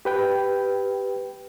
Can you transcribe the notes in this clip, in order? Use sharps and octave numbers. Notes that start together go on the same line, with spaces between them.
G4 B4 G5